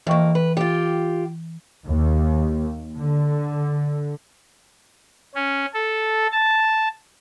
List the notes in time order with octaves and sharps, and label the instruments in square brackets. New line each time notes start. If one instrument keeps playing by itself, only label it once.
[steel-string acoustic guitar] F2 A#3 [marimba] E3 G5 C#6
[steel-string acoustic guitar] B4
F4 G4
[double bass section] D#2
D3
[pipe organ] C#4
A4
A5